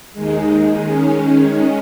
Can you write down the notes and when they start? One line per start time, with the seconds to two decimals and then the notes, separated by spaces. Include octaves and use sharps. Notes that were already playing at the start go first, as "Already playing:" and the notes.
0.13 D#2 D#3 G#3
0.84 D#3 G#3 C#4